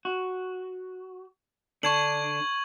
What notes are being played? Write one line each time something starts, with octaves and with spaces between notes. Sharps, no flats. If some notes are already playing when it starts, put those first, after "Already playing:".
F#4
D3 D4 C#6 G#6 F#7